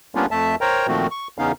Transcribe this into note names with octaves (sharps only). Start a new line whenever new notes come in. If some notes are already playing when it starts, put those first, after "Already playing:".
G3 A#3 B3 C#4 D4 F4
F2 A3 E5 A5
A#4 C5 C#5 G5 A#5
A#2 D#3 F3 A3 C4 F#4
C#6
E2 C#3 B3 C#4 D#4 F5